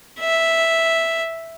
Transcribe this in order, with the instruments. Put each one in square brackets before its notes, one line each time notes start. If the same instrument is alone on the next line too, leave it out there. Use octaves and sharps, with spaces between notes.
[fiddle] E5